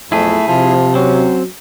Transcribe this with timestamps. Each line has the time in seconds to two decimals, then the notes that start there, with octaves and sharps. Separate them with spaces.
0.12 B1 F2 A3 E4 G#4
0.48 C3 F3
0.95 F#3 C4 C#4